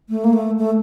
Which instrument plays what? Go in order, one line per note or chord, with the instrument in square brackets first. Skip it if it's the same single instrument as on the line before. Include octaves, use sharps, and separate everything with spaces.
[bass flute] A3
A#3
A3
A3